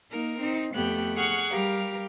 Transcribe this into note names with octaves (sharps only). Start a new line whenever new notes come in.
A#3 D#4 A#4
C4 D#4
F2 A3 B3 G4 G5 F#6
G#4 F#5 C#6 F6 F#6
G3 G4 A#4 F5